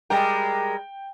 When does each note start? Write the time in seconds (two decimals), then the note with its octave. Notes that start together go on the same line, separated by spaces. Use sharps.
0.10 G3 G#3 A#4 G5